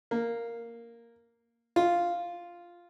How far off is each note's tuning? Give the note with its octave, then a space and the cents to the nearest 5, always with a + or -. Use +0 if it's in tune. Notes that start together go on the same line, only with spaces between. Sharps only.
A#3 -5
F4 -5